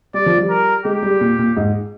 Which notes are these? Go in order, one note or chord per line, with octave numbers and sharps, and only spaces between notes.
G3 D5
F3
G3
A#4
G#3 G4
G3
A#2
A#2
G#2